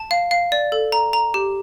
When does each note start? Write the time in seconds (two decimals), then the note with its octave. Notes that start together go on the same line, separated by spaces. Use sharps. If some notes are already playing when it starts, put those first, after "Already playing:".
Already playing: A5
0.11 F5
0.31 F5
0.52 D5
0.72 A4
0.92 A#5
1.13 A#5
1.34 G4